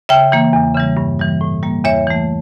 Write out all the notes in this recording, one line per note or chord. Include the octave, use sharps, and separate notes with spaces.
C#3 E5 G5
E3 A#3
E2
C#3 E3 G3
G2
E3 G3
A2
G3 A#3
E2 C#5 E5
E3 A3